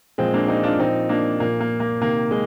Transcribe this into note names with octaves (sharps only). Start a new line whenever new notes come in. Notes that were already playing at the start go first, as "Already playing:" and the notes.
A#2 F3 G#3 C4
A#3 D4
C4 D#4
D4 F4
A#2 F3 C4 D#4
A#3 D4
A#2 F3 A#3
A#3
A#3
C3 D#3 A#3
G#3